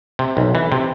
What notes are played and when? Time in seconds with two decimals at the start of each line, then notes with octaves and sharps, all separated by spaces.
0.19 C3
0.37 B1
0.55 E3
0.72 C3